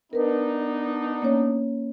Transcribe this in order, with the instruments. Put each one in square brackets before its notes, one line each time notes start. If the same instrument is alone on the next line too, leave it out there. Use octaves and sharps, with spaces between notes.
[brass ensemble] B3 D4 D#4 [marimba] A#4 B4
[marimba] A#3 C#4 C#5